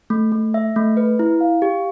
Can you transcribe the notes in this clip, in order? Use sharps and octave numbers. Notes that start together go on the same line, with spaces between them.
A3
A3
E5
A3
B4
E4
F5
G4